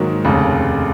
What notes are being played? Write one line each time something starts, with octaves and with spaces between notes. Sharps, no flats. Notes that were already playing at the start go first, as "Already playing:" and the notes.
Already playing: G#2 D#3 F#3 A#3
F1 D#2 C#3